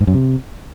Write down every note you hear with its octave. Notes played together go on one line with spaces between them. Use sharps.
G#2
F#2
C3